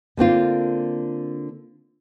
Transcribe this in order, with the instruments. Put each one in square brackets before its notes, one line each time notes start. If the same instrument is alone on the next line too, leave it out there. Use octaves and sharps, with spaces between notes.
[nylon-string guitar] D3 A#3 C4 F4